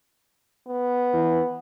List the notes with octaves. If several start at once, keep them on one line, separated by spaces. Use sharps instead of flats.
B3
E3